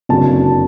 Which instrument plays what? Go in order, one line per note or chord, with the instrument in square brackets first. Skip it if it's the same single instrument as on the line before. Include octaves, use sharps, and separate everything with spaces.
[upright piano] F#1 F2 D3 F#3 A5